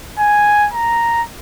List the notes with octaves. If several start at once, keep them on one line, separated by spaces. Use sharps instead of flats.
G#5
A#5